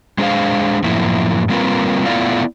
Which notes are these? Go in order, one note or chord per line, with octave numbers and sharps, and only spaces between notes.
G#3 D4 G#4 C5 F5
F#2 A2 F3 A#3 E4
G3 A#3 C4 F4 A#4 B4
A3 B3 E4 F4 D5 F5